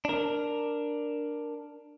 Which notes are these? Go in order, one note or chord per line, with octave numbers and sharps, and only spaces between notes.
D4 A#4